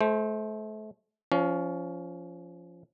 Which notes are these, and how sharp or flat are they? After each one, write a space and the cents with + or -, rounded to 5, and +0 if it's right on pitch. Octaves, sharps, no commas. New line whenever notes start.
A3 -35 C5 +0
F3 -10 C#4 +20